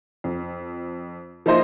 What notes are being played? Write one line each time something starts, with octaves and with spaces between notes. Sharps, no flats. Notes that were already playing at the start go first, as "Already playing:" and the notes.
F2
F3 A#3 D#4 E4 C5 D#5